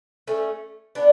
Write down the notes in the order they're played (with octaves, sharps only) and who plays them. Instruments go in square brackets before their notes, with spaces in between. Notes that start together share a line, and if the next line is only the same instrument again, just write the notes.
[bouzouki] A3 C#4
B3 D4